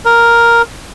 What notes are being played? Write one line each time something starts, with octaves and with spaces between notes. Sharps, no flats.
A#4